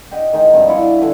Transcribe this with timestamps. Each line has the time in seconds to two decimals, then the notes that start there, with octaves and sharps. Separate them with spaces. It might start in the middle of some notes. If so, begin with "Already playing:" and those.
0.11 G4 D#5 F#5 G5
0.33 D#3 G#3 D#4
0.54 G2 C3 F3 G3
0.68 E4 F4 D5 C#6
0.99 D3 E3